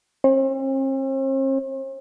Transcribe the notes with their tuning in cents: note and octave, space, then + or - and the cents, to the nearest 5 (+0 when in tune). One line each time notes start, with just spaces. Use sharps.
C4 +45